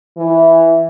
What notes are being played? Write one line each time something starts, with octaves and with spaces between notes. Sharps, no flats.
E3